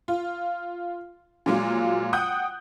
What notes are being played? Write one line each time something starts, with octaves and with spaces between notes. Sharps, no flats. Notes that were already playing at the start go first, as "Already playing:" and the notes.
F4
A#2 F3 F#3 G#3 F4
F#5 G5 D#6 F#6 G6